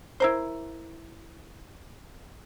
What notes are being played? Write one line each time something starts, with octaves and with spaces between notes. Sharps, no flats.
E4 A#4 C5